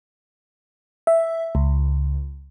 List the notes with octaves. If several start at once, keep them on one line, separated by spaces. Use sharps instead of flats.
E5
C#2